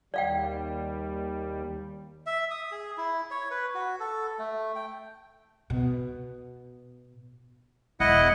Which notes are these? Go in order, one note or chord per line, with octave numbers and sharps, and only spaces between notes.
D#2 G3 D5 F5 G5
E5
D#6
G#4
E4
C#5
B4
F#4
A4
A3
G5
B2
E1 E4 D#5 F#5